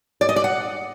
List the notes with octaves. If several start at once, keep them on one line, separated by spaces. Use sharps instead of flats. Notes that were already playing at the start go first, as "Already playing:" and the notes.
D5
D#5
D5
F#5